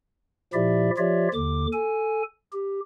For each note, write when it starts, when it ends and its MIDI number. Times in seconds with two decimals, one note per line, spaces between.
0.53 0.90 46
0.53 0.90 53
0.53 0.90 64
0.53 0.90 67
0.53 0.90 74
0.53 0.90 76
0.97 1.28 53
0.97 1.28 65
0.97 1.28 67
0.97 1.28 73
0.97 1.28 74
0.97 1.28 76
1.34 1.66 39
1.34 1.66 50
1.34 1.66 86
1.73 2.23 69
1.73 2.23 80
2.52 2.80 67